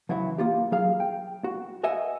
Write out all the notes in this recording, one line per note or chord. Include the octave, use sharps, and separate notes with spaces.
C#2 E3 F#3 E4 F#5
A#3 F4 G4
F#3 G#4 F5
G5
F#4
B4 D#5 E5 F#5 G#5